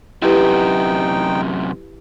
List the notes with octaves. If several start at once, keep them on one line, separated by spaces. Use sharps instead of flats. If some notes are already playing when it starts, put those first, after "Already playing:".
F#2 C3 D#4 E4 G4 B4 G5